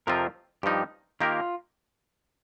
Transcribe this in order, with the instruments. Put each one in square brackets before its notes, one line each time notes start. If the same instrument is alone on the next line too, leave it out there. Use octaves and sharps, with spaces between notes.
[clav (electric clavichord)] F2 C3 F3 C4 F4 [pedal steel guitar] A#4
[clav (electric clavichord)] G2 F3 D#4 [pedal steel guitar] G4
[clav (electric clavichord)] D#3 A#3 G4 A#4 [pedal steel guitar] F4